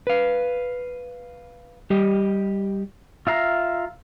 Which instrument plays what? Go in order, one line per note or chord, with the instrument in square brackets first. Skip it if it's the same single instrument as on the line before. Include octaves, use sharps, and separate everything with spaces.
[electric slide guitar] B4 F5
G3 G4 D#5
[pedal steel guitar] F4 E5 F5 A#5